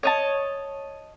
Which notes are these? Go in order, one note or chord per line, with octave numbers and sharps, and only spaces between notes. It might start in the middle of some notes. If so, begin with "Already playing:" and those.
C#5 D#5 A5